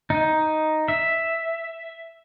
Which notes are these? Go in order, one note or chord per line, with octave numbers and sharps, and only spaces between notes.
D#4
E5